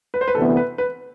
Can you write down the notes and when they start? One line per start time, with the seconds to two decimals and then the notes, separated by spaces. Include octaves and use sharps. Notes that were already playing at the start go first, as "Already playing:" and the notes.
0.14 B4
0.21 C5
0.28 B4
0.35 D2 C3 E3 B3 A4
0.57 B4
0.78 B4